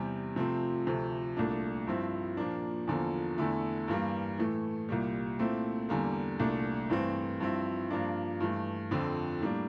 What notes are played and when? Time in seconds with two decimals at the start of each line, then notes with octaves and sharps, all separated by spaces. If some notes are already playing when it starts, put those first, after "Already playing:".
Already playing: E2 C3 G3
0.36 C3 F3 A3 C4
0.86 D2 C3 F3 A3
1.37 C2 A#2 A3 D4
1.87 G2 F3 C4 E4
2.37 A#2 F3 A#3 D4
2.87 E2 D3 F3 A#3
3.38 E2 D3 A3 E4
3.88 G2 E3 G3 A#3
4.38 A2 E3 A3
4.89 C2 A#2 G3
5.39 A#2 A3 C4 E4
5.89 E2 D3 G3 A#3
6.39 C2 A#2 A3 D4
6.90 G2 E3 A3 C4
7.40 G2 F3 C4 E4
7.90 G2 F3 A#3 D4
8.40 G2 E3 A3
8.91 F2 D3 F3 C4
9.41 A2 G3 A#3 D4